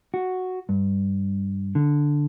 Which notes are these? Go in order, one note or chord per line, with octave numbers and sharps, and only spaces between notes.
F#4
G2
D3